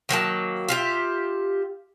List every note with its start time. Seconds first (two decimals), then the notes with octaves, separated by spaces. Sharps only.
0.09 D#3 F#3 A#3 A5
0.69 F4 G4 E5